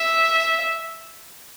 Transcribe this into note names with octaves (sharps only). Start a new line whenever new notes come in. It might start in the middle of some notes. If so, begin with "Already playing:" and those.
Already playing: E5